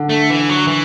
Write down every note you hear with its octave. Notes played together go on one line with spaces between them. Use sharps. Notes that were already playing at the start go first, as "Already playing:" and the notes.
Already playing: D3
A3
E3
F#3
E3